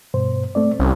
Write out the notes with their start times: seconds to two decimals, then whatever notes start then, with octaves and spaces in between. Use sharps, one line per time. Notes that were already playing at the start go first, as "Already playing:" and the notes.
0.14 G2 B2 C5
0.55 A3 C4 D5
0.79 C2 C#4